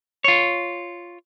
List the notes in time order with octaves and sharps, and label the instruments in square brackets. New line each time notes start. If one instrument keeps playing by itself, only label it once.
[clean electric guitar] F4 C#5